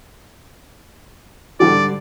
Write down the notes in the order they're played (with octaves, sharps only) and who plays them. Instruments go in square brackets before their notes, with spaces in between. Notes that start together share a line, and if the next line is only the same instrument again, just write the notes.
[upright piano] G#2 D3 G3 [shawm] D5